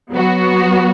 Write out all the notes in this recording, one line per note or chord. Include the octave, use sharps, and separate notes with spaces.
F#3 B3 F#4